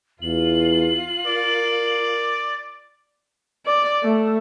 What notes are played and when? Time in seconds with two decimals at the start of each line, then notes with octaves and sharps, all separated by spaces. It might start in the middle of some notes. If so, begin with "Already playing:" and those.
0.22 E2 F4 F#7
1.26 A#4 D5
3.66 D5
4.03 A3